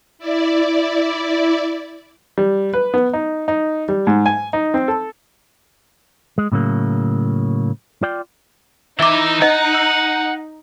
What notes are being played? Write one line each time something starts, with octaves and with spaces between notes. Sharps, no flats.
E4 D5
G3
B4
B3
D#4
D#4
G3
G#2
G#5
D#4
C4
A4
G#3
A2 C#3 F#3 A#3
F4 D5 G5
E3 D#4 E4 E5 D6
D#5 F#5
E6